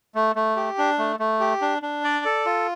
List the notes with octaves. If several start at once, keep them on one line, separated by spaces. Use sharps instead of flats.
A3
A3
G4
D4
A3
A3
G4
D4
D4
D5
A4
F4